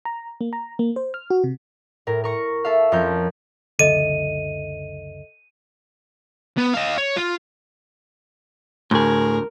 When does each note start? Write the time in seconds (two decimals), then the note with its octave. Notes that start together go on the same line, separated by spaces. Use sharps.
0.05 A#5
0.41 A#3
0.53 A#5
0.79 A#3
0.96 C5
1.14 F6
1.30 F#4
1.44 C3
2.07 A2 A#4
2.24 A#4 C#6 A#6
2.64 A4 E5 F5
2.92 F2 C#4 A#4 G6
3.79 F#1 C#2 D3 A4 D#5 E5 D#7
6.57 B3
6.74 D#5 F5
6.98 C#5
7.16 F4
8.91 D2 A2 G#4 A#4